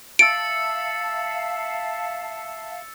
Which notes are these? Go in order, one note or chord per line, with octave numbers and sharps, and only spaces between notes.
E5 F5 A5 E6 A6 C#7 D7